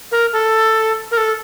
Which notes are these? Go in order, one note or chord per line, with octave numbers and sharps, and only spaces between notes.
A#4
A4
A#4
A4